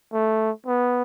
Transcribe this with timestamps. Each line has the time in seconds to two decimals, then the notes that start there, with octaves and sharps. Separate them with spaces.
0.13 A3
0.67 B3